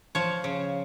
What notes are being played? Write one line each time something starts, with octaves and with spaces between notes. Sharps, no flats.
F3 C#5
C#3